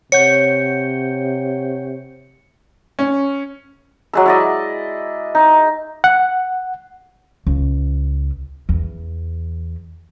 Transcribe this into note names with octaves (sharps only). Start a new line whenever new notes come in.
C3 C#5 F#5 G6 C#7
C#4
F#3 G#3 E6
E4 D5 D#5
D#4
F#5
C#2
E2